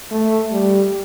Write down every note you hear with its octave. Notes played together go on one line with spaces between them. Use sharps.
A3
G3